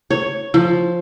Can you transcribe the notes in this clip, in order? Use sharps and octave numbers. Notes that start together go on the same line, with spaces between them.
C#5
F3